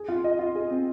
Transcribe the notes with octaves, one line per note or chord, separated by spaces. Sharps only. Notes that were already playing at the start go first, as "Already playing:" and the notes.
Already playing: G#4
F4
D#5
F4
G#4
C4